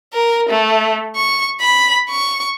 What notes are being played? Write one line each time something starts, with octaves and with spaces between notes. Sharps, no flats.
A#4
A3
C#6
B5
C#6